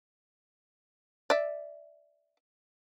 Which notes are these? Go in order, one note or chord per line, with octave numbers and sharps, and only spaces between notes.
D5 E5